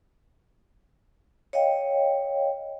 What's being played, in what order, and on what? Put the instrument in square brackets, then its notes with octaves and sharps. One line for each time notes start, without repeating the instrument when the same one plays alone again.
[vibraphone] C#5 D#5 F5 G5